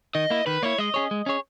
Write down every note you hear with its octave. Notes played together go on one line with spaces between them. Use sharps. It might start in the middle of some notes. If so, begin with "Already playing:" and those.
D#3 D#5
A#3 E4
D#3 B4
A#3 E4 C#5
G#3 D#5
C#4 G#4 C#5
G#3
C#4 G#4 C#5